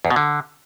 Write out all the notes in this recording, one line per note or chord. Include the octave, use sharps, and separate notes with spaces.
E2
B2
D3